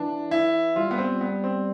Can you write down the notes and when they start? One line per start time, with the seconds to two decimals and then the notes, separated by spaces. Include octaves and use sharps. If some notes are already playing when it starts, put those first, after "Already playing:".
Already playing: E3 D4
0.31 E4
0.76 G3 F4
0.91 B3
0.98 C4
1.21 B3
1.44 C4